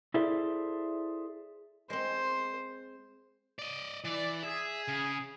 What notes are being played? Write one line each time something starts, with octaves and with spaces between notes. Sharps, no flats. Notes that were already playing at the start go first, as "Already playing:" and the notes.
E4 G#4 A4 C5 D5 E5
G#3 C4 C5
D5 D#5
E3 D5
G#4 E5
C#3